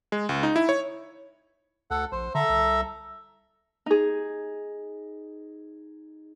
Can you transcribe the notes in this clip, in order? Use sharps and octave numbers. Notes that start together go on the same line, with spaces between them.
G#3
C#2
D#4
E4
C#5
D2 A4 F#5
A#1 C5
D3 A4 E5 A#5
C2
D#4 G#4